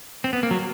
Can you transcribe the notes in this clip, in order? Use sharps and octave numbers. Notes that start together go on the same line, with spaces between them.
C4
B3
A#3
F#3